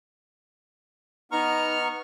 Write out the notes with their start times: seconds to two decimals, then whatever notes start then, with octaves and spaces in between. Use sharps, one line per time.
1.32 B3 D#4 A#5 C#6 F6